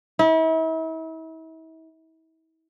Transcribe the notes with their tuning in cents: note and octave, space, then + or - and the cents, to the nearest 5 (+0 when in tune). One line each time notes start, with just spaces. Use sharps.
E4 -40